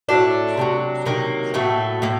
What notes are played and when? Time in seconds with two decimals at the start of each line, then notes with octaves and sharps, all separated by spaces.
0.09 A2 F#3 A3 D4
0.57 C3 D#3 F#3
1.05 C3 D#3 F#3 A#3
1.54 A2 F#3 A3
2.02 A2 A#3